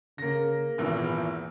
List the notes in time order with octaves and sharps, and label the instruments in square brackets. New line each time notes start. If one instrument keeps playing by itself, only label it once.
[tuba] C#3 [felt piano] A#3 A#6
[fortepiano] G#1 E2 E3 [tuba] A#2